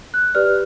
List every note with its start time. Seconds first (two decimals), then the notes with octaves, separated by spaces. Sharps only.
0.14 F#6
0.35 G4 B4 D5 F6